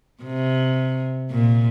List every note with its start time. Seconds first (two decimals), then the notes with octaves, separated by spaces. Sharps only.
0.23 C3
1.31 A#2